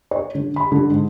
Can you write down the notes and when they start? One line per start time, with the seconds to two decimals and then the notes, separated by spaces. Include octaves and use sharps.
0.11 C#5
0.35 D3
0.56 B5
0.72 D3
0.90 G#2